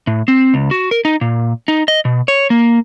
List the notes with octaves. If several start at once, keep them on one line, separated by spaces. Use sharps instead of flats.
A2
C4
C#2
F#4
A#4
D#4
A#2
D#4
D#5
B2
C#5
A#3